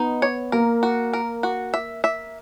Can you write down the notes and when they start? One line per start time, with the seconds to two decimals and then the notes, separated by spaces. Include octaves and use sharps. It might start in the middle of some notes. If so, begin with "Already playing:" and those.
Already playing: B3 D#4
0.22 C#5
0.52 A#3 A#4
0.83 F#4
1.13 A#4
1.43 F#4
1.74 E5
2.04 E5